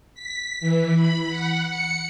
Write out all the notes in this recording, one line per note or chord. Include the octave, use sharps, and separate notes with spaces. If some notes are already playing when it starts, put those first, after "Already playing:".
B6
E3
B5
F#5
C#7